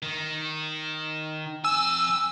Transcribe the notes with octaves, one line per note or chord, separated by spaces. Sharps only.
D#3
F2 G#5 E6